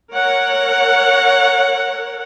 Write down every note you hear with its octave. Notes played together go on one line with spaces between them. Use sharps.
A#4 C#5 F#5